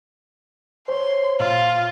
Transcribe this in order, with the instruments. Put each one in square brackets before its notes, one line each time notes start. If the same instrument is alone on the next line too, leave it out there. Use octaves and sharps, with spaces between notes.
[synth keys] C5 C#5 [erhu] C6
[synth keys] A#2 [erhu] F4